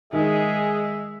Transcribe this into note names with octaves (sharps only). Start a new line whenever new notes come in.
D#3 G#3 G#4 E5